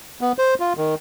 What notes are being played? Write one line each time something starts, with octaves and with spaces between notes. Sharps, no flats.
B3
C5
F4
D#3